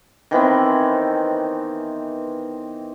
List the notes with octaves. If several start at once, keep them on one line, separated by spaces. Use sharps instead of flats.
D#3 E3 B3 C4